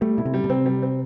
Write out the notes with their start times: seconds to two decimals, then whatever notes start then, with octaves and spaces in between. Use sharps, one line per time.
0.01 G3 A3
0.17 B2 E4
0.25 C3
0.34 G3
0.44 B2
0.49 C3 C4
0.66 G3
0.82 C4